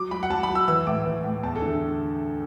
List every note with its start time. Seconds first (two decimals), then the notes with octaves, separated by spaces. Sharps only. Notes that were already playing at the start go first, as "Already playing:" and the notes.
Already playing: F#3 D6
0.11 F#3 B5
0.23 F#5
0.30 F#3 A5
0.43 B5
0.49 F#3
0.55 E6
0.68 E3 E6
0.87 A2 D6
1.06 E3
1.24 A2
1.43 E2 A5
1.56 A4
1.62 D3